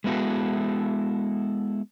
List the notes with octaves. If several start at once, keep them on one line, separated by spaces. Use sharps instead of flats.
G#3 B3 E4 F#4 A4